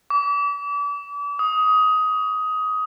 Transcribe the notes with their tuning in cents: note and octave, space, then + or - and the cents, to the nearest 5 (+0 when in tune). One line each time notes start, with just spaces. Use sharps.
D6 -35
D#6 +15